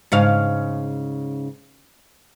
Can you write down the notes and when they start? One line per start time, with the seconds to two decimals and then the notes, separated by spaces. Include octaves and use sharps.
0.12 G#2 C#3 F5